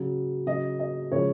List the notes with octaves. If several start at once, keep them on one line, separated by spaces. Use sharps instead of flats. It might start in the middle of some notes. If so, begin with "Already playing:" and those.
Already playing: C#3 F#3
C#3 F#3 D#5
D#5
C#3 F3 G#3 C#5